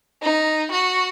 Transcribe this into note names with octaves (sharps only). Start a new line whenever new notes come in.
D#4
F#4